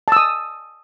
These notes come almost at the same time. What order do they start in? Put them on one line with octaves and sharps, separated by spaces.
A5 E6 D#6